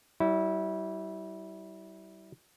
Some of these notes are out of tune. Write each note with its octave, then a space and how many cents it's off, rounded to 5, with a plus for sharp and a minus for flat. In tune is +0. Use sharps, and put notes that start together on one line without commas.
G3 -40 E4 -25